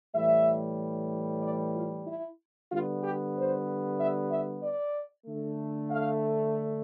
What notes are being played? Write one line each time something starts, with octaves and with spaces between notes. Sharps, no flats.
A2 E3 G3 E5
D5
F4
E4
D3 G3 B3 F4
G4
C5
E5
E5
D5
D3 A3
F5